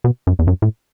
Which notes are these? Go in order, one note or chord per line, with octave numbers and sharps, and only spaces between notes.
B2
F#2
E2
F#2
A2